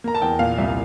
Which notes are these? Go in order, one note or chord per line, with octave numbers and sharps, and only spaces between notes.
A#3 A#5
A5
E2 G5
A#2 F5
C2 E5